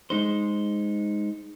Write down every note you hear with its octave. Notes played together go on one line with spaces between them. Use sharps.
G#3 D#4 C5